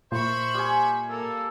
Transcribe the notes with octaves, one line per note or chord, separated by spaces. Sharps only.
A#2 C5 E5 B5 C#6
G3 G#5
A#3 A4